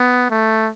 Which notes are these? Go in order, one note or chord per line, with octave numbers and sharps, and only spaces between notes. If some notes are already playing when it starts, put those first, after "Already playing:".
Already playing: B3
A3